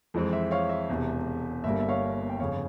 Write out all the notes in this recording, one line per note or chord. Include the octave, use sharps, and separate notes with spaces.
F2 E3 G#3 C4
E5
C#5 F5
E5
E1 E2 C3
G1 G2 G3 A#3 E5
E5
C#5 F5
G5
G1 F2 C#3 C#5 F5